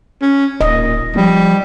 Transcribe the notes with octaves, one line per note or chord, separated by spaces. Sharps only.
C#4
D1 A#2 D#5
F3 G3